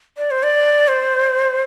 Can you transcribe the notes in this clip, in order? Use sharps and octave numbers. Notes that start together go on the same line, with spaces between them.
D5
C5
D5
C5